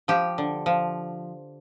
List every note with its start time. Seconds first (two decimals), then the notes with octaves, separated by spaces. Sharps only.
0.08 F3 G4
0.38 D3
0.66 F3